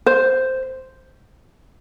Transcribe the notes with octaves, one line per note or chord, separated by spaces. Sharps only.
C5